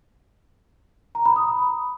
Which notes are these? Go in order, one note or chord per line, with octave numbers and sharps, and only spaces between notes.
A#5
B5
D#6